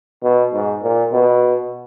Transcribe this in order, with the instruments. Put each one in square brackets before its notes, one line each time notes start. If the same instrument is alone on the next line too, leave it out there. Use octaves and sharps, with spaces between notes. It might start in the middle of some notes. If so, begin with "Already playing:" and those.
[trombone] B2
G#2
A#2
B2